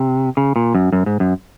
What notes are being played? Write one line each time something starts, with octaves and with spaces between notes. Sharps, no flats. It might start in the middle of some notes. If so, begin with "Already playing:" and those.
Already playing: C3
C#3
A#2
F#2
F#2
G#2
F#2